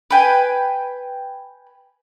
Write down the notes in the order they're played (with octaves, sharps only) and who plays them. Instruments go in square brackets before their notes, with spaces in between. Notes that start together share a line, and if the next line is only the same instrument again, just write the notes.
[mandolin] B4 G5 G#5